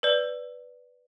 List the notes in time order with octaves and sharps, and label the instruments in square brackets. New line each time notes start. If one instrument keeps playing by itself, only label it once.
[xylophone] B4 D5